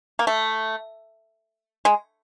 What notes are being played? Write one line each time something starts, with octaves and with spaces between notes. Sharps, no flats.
A#3
A3
G#3